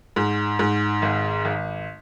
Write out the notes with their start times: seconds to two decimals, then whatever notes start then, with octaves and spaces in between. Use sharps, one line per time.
0.16 G#2
0.59 G#2
1.02 G#1
1.45 G#1